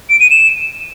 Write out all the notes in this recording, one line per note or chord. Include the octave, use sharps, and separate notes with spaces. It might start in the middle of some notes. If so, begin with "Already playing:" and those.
D7
D#7
E7